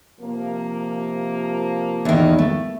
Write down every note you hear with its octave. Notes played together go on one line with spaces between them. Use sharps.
C3 F3 A#3
E2 D#3
A3